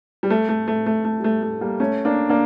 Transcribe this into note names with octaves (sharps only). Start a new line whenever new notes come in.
G3
A3
A3
A3
A3
A3
G3
A3
A3
G3 A#3
A3 C#4
A#3 D4
A#3 D4